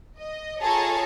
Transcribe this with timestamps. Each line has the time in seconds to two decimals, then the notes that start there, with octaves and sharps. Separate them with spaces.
0.19 D#5
0.62 F4 G#4 A4 C#5 A5 A#5